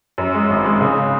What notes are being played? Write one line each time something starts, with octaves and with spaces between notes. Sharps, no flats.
F#2
G#3
G#1
G#3
C#3